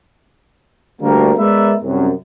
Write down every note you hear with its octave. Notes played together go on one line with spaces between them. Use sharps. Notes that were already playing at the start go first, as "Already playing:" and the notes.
D2 G3 A3 A#3
G#3 B3 A#4 B4 D5 E5
C2 F#2